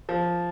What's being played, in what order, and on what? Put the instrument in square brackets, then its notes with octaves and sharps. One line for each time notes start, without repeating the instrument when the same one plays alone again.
[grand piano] F3